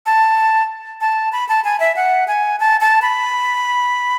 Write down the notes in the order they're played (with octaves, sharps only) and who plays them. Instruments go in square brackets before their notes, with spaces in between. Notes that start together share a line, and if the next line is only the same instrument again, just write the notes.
[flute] A5
A5
B5
A5
G#5
E5
F#5
G#5
A5
A5
B5